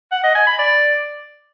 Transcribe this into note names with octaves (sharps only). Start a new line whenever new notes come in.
F#5
D#5
G#5
B5
D5